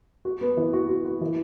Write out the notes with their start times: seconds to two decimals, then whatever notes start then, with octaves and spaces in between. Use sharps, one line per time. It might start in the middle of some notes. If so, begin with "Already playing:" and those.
0.25 F#4
0.41 B3
0.57 E3
0.73 F#4
0.89 F#4
1.05 F#4
1.21 E3